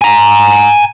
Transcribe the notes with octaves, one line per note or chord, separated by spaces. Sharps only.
G#5 A#5